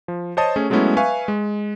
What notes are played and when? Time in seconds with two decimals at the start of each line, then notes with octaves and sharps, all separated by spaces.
0.08 F3
0.37 C5 C#5 D#5 A5 D#6
0.56 A3 C#4 G#4
0.70 F#3 G#3 A3 B3 C#4 E4
0.97 B4 E5 F5 G#5 C#6
1.28 G#3